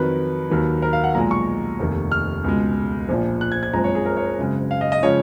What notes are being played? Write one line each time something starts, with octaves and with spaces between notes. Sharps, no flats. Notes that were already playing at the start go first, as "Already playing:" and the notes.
Already playing: F2 D#3 F#3 B4
D#2 D#3 F#3
A#4
F5
F#5
B1 A#2 F3 G#3 A#5
C#6
F1 D#2 D#3
F6
C#2 B2 G#3
A#1 A#2 F3
F#6
G#6
G#6
F#1 F2 F3 G#3 A#5
C#5
G#4
A#4
C#5
G#1 F#2 C#3 G#3
F5
D#5
D#5
C#3 F3 G#3 C#5